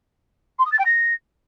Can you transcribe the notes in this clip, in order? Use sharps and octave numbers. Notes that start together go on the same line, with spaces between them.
C6
D#6
A6
G5
A#6